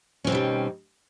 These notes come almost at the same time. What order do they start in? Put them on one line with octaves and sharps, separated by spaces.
C#4 C4 B2 G3 D#3